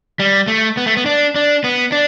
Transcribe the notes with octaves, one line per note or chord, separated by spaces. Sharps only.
G3
A3
B3
A3
B3
D4
D4
B3
D4